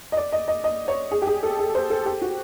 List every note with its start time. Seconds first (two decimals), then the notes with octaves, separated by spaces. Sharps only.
0.12 D#5
0.17 D5
0.33 D#5
0.48 D#5
0.64 D#5
0.88 C#5
1.11 G#4
1.22 G4
1.27 G#4
1.43 A4
1.59 G#4
1.75 C5
1.90 A4
2.06 G4
2.22 F#4